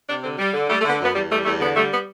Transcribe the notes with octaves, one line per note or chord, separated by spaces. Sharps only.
C3 D4
D3 C4
G3
D3
G3 A3
A3
D3 B3
A3
F#2 B3
E2 G3
G3 A3
E2 A3
D3 B3
G3 A3
B3